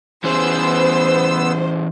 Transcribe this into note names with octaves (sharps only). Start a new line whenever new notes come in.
E3 B3 C#4 G#4 C5 E6